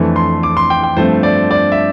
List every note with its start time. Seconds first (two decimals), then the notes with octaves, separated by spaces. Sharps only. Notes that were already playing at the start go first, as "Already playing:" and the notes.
Already playing: F2 E3 A3 D4
0.16 C6
0.43 D6
0.57 C6
0.70 G5
0.83 G5
0.97 G2 F3 A3 C4 C5
1.23 D5
1.51 D5
1.72 E5